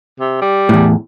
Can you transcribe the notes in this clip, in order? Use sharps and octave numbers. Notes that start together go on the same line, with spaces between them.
C3
G3
E2 A2